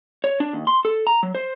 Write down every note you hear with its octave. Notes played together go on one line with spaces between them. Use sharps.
C#5
D4
D#2
C6
A4
A#5
F#3
C5